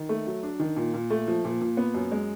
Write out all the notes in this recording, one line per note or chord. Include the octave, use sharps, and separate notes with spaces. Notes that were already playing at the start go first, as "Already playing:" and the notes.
Already playing: D#3
A3
F#3
D4
D#3
A#2
A#2
A3
F3
A#2
A#2
B3
F#2
G#3